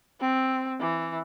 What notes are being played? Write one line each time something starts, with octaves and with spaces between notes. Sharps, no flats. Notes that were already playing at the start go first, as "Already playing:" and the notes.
C4
E3